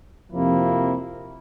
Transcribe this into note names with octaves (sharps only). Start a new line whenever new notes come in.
F2 C3 F3 A#3 E4